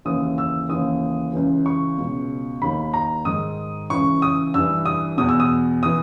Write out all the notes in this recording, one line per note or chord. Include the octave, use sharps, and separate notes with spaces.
D#2 C#3 E3 D#6
E6
D#2 C#3 E3 D#6
C#2 C#3 E3
C#6
C#2 B2
D#2 D#3 B5
A#5
G#2 D#3 D#6
C#2 C#3 E3 C#6
D#6
G2 E3 E6
D#6
E2 B2 D#6
E6
D#6
E3 D#6